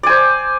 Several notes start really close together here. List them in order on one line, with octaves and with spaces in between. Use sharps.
D5 G#5 C5